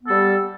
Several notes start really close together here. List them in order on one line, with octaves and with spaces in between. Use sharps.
B3 A4 G3